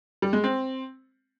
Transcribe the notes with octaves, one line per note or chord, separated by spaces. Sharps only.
G3
G#3
C4